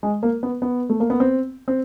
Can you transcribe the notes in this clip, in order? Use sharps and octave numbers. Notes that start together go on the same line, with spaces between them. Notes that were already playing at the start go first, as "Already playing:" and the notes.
G#3
A#3
B3
B3
A3
A#3
B3
C4
C4